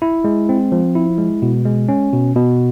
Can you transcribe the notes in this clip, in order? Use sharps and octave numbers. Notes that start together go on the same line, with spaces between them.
E4
G#3
C4
F3
E4
G#3
B2
G#3
C#4
B2
B2